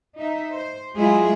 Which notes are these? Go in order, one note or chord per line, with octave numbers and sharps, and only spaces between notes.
D#4 E5
C5
F#3 G#3 E4 F4 G#4